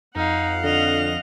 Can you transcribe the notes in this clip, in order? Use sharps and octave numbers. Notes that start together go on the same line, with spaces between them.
F2 D#4 F5 F#5
D3 D#5 F7